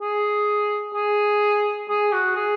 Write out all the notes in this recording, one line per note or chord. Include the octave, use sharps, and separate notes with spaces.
G#4
G#4
G#4
F#4
G#4